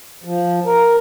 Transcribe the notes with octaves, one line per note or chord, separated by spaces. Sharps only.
F3
A#4